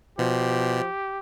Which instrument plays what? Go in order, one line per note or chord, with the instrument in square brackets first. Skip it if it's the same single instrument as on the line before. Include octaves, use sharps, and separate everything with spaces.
[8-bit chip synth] B2 [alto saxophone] F3 [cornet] G4